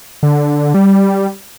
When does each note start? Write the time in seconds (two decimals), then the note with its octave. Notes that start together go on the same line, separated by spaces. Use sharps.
0.23 D3
0.74 G3